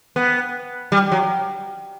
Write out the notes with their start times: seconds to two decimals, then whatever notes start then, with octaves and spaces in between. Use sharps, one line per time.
0.16 B3
0.92 G3
1.12 F#3